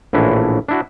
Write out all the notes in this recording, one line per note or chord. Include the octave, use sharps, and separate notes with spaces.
A#1 A2 E3 C#4 D4 E4
D4 E4 F#4